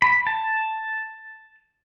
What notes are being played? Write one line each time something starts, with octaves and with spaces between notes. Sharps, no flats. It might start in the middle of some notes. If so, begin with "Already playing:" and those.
B5
A5